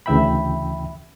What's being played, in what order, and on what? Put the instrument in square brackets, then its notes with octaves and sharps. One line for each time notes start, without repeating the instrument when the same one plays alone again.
[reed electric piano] D2 C#3 E3 E5 G5 B5